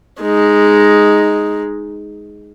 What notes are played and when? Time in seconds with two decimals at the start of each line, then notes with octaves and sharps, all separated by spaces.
0.21 G#3 D#4